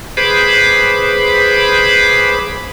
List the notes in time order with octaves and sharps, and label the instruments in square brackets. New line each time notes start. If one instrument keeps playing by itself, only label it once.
[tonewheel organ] G#4 B4 C5 B5 D6